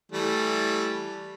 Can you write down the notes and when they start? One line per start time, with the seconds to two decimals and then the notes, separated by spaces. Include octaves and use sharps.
0.12 E3 G3 A3